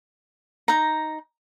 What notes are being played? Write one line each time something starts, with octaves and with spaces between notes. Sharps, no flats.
D#4 A#5